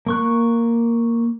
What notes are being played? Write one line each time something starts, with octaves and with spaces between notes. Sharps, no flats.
A#3 C#6 F#6